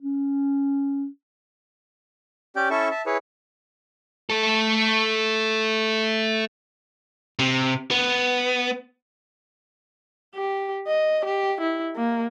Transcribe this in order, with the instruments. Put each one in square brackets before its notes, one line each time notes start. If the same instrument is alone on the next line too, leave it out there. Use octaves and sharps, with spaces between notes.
[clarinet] C#4
[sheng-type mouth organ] C#4 G4 D5 G5
C#4 E4 A4 E5 A5 C#6
E5 A5
E4 G#4 B4 C#5
[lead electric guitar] A3 A4
C3
B3
[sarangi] G4
D#5
G4
E4
A#3